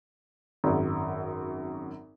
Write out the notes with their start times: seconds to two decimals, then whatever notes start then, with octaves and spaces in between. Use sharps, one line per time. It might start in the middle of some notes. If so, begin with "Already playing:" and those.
0.64 G#1 F#2